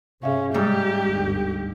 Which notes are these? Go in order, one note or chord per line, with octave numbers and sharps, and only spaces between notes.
G2 C3 C#4 G#4 E5 F5
G#2 G3 G#3 G4
G1 D2